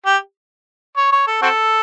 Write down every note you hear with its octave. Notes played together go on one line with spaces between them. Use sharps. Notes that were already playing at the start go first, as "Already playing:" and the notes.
G4
C#5
C#5
A4
C4 F#4 A4